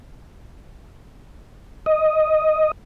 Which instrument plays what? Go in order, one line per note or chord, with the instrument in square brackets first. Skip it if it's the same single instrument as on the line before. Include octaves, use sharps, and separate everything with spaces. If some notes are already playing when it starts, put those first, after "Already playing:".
[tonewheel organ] D#5